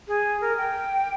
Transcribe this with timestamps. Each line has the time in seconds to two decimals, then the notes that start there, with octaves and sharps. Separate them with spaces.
0.08 G#4
0.41 A#4
0.57 G5